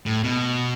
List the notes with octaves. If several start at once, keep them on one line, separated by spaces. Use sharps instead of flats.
A2
B2